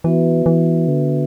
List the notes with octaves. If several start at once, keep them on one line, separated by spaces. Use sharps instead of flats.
E3 B3 F#4 B4 E5
E3
D3